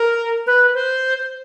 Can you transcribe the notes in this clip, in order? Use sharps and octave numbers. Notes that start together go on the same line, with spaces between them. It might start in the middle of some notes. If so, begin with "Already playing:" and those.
Already playing: A#4
B4
C5